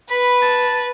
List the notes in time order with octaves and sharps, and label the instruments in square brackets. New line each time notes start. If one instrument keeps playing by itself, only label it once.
[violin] B4 [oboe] B5
[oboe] A5